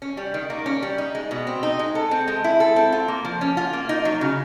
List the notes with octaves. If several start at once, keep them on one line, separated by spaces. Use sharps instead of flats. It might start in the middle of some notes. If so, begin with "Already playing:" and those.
C#4
G3
D#3
A#3
C#4
G3
D#4
G#3
B2
C4
D#4
G#3
A4
C4
G#3
E4
A4
C4
F4
A#3
F3
C#4
F4
A#3
D#4
F#3
C#3